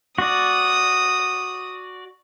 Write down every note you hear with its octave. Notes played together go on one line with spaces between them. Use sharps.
F#4 D5 D#6